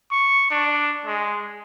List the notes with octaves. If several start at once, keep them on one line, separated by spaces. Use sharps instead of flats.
C#6
D4
G#3